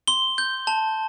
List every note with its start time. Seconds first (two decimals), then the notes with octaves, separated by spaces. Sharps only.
0.08 C6 G7
0.38 G6
0.67 A5